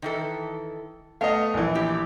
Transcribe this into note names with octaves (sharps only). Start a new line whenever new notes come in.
D#3 E3 A4
A3 B3 D#5 F5
A#1 E3
E4 G4